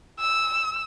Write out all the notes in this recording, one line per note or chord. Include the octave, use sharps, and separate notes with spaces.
E6